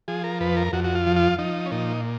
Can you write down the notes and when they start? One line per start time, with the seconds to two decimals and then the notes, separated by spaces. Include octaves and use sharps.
0.08 F3 G#4
0.24 A#4
0.40 F2 B4
0.57 A#4
0.73 F2 F#4
0.84 F#4
0.95 F4
1.07 F3
1.16 F4
1.39 F3 D#4
1.66 C#4
1.71 A#2 D#4